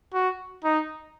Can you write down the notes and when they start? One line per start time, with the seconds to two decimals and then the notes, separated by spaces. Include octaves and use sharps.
0.14 F#4
0.64 D#4